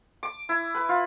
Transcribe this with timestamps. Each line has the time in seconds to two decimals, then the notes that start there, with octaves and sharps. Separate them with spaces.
0.23 D6
0.49 E4
0.75 B4
0.89 F4